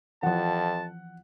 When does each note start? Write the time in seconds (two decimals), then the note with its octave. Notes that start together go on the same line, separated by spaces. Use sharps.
0.23 F2 E3 F3 F#5 A5